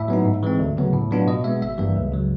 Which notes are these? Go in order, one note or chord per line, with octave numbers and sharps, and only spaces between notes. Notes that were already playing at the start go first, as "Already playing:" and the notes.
Already playing: A2 E5
F#3 B3 D#4
G#2
E3 G#3 C4
D2
C#3 F#3 B3
A2
F#3 B3 D4 F4
B2 D#5
G#3 B3 E5
G#1 E5
G2 E3 G3 A#3
C#2
C#3 F#3